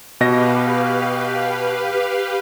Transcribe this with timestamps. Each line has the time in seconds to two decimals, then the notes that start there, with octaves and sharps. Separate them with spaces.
0.21 B2 G4 B4 D#5 F5 A#6